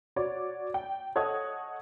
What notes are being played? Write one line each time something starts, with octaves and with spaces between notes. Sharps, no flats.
F#4 C#5 D5
G5
A4 C#5 D#5 F#5 D#6 G#6